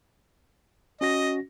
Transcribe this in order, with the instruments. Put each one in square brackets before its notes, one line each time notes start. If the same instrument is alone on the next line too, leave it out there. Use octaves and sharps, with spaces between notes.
[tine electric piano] C#4 F#4 A#6 [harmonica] D#5